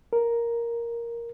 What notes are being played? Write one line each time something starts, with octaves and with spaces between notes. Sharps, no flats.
A#4